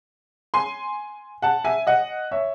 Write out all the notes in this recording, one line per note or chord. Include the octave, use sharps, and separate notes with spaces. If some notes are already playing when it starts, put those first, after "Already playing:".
G#5 C6
F#5 A5
E5 G#5
D#5 F#5
C#5 E5